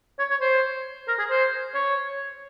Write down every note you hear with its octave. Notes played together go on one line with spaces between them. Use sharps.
C#5
C#5
C5
A#4
G#4
C5
C#5